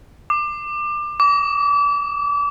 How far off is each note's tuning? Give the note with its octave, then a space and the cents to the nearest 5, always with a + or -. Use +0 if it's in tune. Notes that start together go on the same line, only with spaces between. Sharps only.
D6 +25
D6 -35